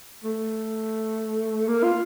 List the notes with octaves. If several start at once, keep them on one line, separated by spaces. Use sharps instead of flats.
A3
A#3
F4